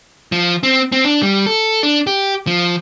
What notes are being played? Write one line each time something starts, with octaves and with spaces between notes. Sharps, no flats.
F3
C4
C4
D4
G3
A4
D4
G4
F3